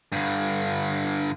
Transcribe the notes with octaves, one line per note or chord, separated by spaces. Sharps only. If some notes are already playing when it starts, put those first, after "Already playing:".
G2 D3